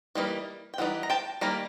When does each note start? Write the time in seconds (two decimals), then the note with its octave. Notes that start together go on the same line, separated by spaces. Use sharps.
0.15 E3 G3 A#3 D#4
0.74 G5
0.78 E3 G3 D#4 F#5
1.03 A#5
1.10 G5 A5
1.41 D#3 G3 A#3 A#5